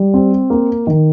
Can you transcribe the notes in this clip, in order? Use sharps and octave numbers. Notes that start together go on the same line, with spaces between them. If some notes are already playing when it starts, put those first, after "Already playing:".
Already playing: G3
C4
A#3
D#3